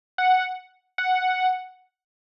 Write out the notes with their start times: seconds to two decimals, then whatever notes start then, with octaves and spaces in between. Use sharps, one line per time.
0.18 F#5
0.98 F#5